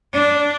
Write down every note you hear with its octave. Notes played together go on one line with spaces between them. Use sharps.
D4